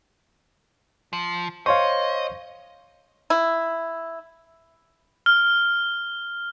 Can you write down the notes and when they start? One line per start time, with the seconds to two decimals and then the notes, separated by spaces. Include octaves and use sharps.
1.13 F3
1.66 C5 C#5 D#5 F5 C6 C#6
3.30 E4
5.26 F6